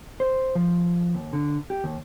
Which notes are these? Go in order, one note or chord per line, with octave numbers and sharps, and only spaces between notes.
C5
F3
D#2
D3
G4
D#2